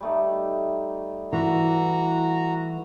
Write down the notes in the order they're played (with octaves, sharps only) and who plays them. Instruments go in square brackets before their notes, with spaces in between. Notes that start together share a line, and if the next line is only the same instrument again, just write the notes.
[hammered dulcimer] G3 A3 D#4
[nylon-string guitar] E3 [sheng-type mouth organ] F#4 A#5